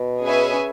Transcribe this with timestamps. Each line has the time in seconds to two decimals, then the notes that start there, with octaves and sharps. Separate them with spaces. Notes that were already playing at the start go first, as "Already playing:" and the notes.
Already playing: B2
0.24 C#4 G#4 B4 E5 G#5